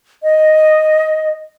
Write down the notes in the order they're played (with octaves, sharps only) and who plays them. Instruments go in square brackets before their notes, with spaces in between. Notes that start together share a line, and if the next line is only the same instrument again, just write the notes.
[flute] D#5